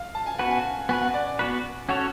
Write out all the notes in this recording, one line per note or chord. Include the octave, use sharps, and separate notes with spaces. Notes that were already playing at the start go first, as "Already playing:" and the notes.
Already playing: F5
A5
G#5
B3 F#4 B4 F#5
G#5
B3 F#4 B4 G#5
F#5
D5
D5
B3 F#4 B4
C#4 F#4 A4 C#5 F#5